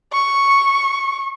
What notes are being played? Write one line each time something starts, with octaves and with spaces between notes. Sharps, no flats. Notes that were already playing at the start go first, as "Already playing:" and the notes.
C#6